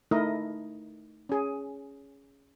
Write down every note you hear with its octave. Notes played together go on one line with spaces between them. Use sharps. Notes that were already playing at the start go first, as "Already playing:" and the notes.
A3 D#4 E4 A#4 D#5
C#4 G#4